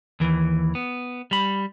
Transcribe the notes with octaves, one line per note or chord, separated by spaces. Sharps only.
D#2 E3
B3
G3 B5